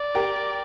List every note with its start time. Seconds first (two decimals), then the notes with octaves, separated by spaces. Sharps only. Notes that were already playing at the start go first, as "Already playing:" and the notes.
Already playing: D5
0.15 G4 A#4